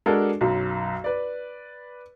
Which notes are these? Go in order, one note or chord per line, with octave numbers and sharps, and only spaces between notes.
G#3 D4 F#4 A4 A#4
B1 F#2
B4 D5